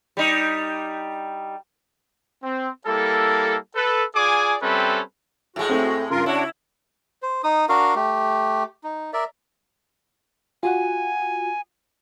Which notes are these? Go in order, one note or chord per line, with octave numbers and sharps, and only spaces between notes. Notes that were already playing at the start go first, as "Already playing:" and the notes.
G3 D#4
C4
G3 A#3 E4 A4
A4 B4
F4 G#4 D5 G#5 D6
G3 C4 C#4 A4 B4 E5
A2 G#3 F#4
A3 C4
G2 C#3 F4 A#4
D4 E4 F#4 C#5
C5
D#4 D#6
D4 F#4 A#4 F5
A3 G4
D#4
A#4 D5 E5
F4 F#4 F#5 G#5